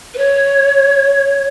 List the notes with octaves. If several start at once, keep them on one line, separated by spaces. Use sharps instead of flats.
B4
C#5